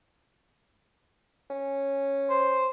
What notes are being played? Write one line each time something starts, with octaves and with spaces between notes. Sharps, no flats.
C#4
C5